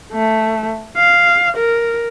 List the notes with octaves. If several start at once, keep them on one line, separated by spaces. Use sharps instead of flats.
A3
F5
A#4